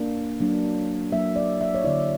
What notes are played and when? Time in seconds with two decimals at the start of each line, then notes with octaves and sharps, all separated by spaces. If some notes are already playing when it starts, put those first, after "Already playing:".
Already playing: A#3 D4
0.40 F#3 A#3 D4
1.12 F#3 A#3 D4 E5
1.36 D5
1.61 E5
1.75 C#5
1.84 D3 A#3 E4 D5